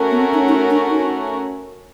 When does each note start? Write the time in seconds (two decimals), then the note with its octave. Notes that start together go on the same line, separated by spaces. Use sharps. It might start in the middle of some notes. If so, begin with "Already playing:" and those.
Already playing: A3 C#4 F#4 A#4
0.11 B3
0.20 C4
0.34 D#4
0.48 D#4
0.70 D4
0.90 D#4